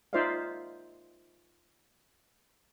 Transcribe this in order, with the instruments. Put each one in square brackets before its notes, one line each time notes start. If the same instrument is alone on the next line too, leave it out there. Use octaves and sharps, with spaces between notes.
[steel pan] D#4 F4 C5 D5 E5 F5